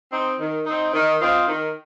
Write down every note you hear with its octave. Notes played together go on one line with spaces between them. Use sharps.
C4 D#4
D#3
C4 D#4
D#3
C4 F4 C5 D#5
D#3